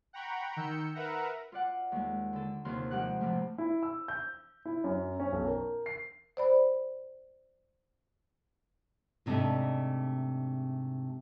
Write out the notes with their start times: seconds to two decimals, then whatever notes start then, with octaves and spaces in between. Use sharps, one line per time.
0.13 F#5 G5 A#5 B5 C#6
0.56 D#3 E6 G6 C#7
0.95 A#4 B4 E5 F#5 A#5
1.52 F4 D5 F#5
1.92 D#2 G#3
2.33 D3 A4
2.65 D#2 C3 F4 C6
2.91 F2 G#3 G4 F#5 F#6
3.21 A2 C3 F3 A3
3.58 E4
3.83 E6
4.08 G6
4.65 E4
4.84 F#2
5.20 C#4
5.32 B1
5.47 A#4
5.86 C7
6.37 C5 D5 B5
9.26 G#2 C3 G3 A3 D4 D#5